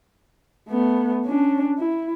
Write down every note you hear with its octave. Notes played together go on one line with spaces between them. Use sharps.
A3 B3
C#4 D4
E4